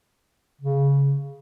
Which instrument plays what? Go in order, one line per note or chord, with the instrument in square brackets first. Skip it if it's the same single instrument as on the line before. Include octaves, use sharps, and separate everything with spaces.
[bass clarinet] C#3